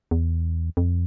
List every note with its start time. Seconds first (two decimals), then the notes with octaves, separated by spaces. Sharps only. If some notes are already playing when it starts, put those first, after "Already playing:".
0.11 E2
0.77 F2